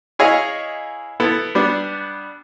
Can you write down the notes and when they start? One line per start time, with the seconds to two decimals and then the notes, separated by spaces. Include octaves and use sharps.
0.19 E4 G#4 C#5 D#5 F5
1.20 B3 E4 A4
1.55 G3 B3 D4